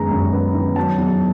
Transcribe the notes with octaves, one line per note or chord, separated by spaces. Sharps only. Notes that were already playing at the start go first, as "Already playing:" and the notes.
Already playing: F#2 D#3 G#3 B3 A#5
F#2
B3
D#3
F#3 A5
E2